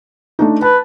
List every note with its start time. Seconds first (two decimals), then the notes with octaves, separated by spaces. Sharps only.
0.39 A3 D4 D#4
0.62 B4 A5